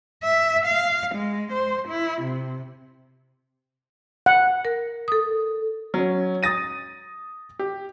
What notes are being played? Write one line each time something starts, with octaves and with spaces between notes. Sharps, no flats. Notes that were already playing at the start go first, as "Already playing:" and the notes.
E5
F5
G#3
C5
E4
C3
F#5
A#4
A4 D#6
F#3 C#4
D#6 A6 A#6 D#7
G4